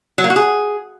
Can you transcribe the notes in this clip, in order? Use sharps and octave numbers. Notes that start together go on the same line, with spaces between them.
F#3
A#3
F#4
G#4